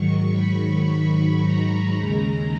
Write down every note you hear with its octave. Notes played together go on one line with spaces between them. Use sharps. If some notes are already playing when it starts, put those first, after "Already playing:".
Already playing: G#2 D#3 F#3 C#6
B5
B5
A#5
D#2 C#3 G#3